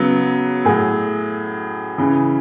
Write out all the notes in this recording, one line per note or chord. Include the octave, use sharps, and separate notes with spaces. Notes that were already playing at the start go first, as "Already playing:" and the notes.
Already playing: C#3 F#3 B3
A2 F#3 G#4
C#3 E3